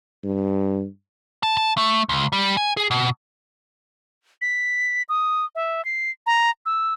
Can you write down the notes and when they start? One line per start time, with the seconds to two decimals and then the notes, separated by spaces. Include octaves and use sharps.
0.24 G2
1.43 A5
1.57 A5
1.78 A3
2.09 C#2
2.32 G3
2.57 G#5
2.77 G#4
2.91 B2
4.42 B6
5.09 D#6
5.55 E5
5.85 C7
6.26 A#5
6.66 E6